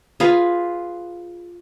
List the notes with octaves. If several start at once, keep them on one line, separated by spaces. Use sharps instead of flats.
F4 G#4 B4 F5